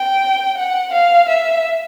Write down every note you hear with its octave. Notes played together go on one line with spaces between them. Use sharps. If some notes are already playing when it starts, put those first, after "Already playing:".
Already playing: G5
F#5
F5
E5